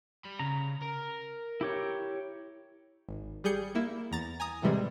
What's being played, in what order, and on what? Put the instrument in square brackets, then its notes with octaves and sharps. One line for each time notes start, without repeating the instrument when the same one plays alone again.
[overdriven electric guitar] G3 B5
[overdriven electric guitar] C#3 [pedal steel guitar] A#5
[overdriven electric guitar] A#4
[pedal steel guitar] E4 G4 C#5
[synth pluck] G#1
G3 G#4 G6 C#7
A#3 E4
E2 A#5 A6
G#5 A#5 D#6
A2 C3 E3 G3 G#3